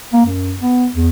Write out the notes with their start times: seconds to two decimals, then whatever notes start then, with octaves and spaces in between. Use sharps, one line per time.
0.13 A#3
0.26 F#2
0.61 B3
0.96 E2